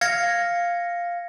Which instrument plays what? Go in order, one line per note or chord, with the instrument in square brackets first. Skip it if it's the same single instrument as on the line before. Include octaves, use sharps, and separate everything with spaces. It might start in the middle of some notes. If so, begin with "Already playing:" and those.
[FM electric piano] F5 [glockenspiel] G#6 A#6 C#7